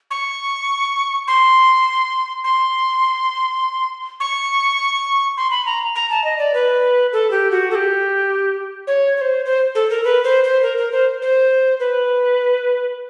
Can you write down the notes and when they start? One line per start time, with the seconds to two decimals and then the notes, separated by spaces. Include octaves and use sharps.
0.11 C#6
1.28 C6
2.44 C6
4.20 C#6
5.37 C6
5.51 B5
5.66 A#5
5.95 A#5
6.10 A5
6.24 D#5
6.38 D5
6.54 B4
7.13 A4
7.31 G4
7.51 F#4
7.71 A4
7.75 G4
8.87 C#5
9.17 C#5
9.21 C5
9.45 C5
9.75 A4
9.90 A#4
10.04 B4
10.24 C5
10.44 C5
10.63 A#4
10.77 A#4
10.92 C5
11.22 C5
11.80 B4